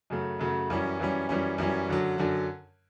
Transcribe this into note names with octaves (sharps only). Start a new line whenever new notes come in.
F#2 C#3 F#3 A3
F#2 C#3 F#3 A3
F#2 E3 G3 C#4
F#2 E3 G3 C#4
F#2 E3 G3 C#4
F#2 E3 G3 C#4
F#2 D3 F#3
F#2 D3 F#3